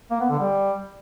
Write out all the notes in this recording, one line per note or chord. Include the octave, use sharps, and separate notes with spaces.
A#3
B3
D3
G3